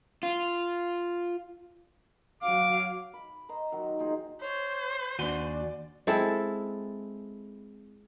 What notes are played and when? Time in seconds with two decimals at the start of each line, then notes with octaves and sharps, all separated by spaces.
0.23 F4
2.42 F#3 F5 D6
3.14 B5
3.49 C5 D#5 A#5
3.72 D#3 F#3
3.99 A#2 D#4 G#4 C5
4.41 C5 C#5
5.19 D#2 D4 F#4 D5 G#5 C6
6.07 G#3 C4 E4 A4